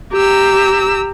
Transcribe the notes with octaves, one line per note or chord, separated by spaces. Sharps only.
G4 A#5 E6